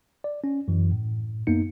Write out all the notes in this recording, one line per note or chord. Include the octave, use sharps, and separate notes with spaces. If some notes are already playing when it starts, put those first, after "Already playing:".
D5
C#4
F#2 E3
A2
F#2 A#3 B3 D#4 C#7